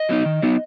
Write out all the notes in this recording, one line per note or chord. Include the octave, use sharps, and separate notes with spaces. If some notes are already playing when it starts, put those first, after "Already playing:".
Already playing: D#5
F#3 B3 D#4
D#3
F#3 B3 D#4